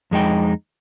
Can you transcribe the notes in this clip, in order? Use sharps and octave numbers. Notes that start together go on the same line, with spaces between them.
F2 G#3 D#4 G5